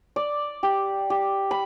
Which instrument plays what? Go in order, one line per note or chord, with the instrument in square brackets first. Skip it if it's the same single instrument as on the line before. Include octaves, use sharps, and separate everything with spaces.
[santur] D5
G4
G4
B5